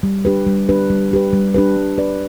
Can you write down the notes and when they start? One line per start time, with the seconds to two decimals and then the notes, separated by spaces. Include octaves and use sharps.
0.03 G3
0.25 D4 G4 B4
0.47 G3
0.69 D4 G4 B4
0.90 G3
1.11 D4 G4 B4
1.33 G3
1.54 D4 G4 B4
1.76 G3
1.98 D4 B4 D5